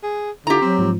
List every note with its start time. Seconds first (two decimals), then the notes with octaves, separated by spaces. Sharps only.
0.03 G#4
0.47 D3 E4 F4 G4 A#5
0.62 F#3 C4 C6
0.78 G#2 F3